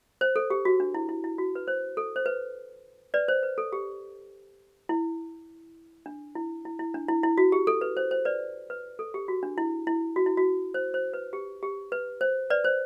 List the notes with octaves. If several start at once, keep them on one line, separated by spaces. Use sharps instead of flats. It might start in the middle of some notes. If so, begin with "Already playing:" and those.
C5
A4
G4
F#4
D4
E4
E4
E4
F#4
B4
C5
A4
C5
B4
B4 D5
C5
B4
A4
G4
E4
D4
E4
E4
E4
D4
E4
E4
F#4
G4
A4
B4
C5
C5
B4 D5
B4
A4
G4
F#4
D4
E4
E4
F#4
E4
F#4
C5
C5
B4
G4
G4
B4
C5
B4 D5
C5